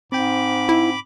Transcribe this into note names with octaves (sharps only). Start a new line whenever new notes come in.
G#2 C4 G5 B5 D6
E4